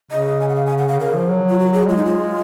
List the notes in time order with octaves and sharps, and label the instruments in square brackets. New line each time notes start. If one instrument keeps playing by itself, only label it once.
[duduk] C#3 [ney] D#5
[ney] G#5
F#5
F5
G#5
F#5
F5
[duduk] C#3 [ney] A#4
[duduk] F3
F#3
[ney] F4
F#4
G#4
[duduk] G#3 [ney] F4
[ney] D#4
F4